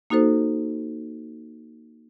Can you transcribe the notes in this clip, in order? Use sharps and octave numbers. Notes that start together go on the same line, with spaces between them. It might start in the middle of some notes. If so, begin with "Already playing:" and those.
A#3 D#4 F#4 A4 C5